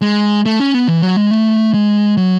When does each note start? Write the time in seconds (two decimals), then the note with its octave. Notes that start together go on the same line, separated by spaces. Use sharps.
0.01 G#3
0.46 A3
0.60 C#4
0.74 B3
0.88 E3
1.02 F#3
1.17 G#3
1.31 A3
1.74 G#3
2.17 F#3